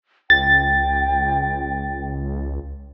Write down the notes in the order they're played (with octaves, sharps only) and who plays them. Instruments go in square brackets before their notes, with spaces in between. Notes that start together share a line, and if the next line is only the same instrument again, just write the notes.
[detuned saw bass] C#2 [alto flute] G5 [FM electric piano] A6